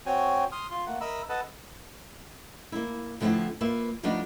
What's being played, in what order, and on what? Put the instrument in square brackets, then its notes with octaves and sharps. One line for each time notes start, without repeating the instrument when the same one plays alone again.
[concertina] C4 F#4 C#5 G5 G#5
C6 D#6 F6
F4 C6
A3 A#3 F#5
A#4 D#5 E5 B5 E6
A4 B4 D#5 F#5 A5
[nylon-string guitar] A#3 E4
D3 F3 A3 B3 C4 E4
A#3 F4 B4 E5
F3 G3 A3 B3 D4 D#4